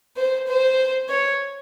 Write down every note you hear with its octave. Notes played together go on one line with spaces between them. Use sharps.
C5
C5
C#5